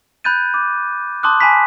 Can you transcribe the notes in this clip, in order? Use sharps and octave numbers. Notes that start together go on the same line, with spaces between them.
B5 F#6 G6 A6 D#7
D6
A5 C6 D6 D#6 F#6
G#5 A5 B5 B6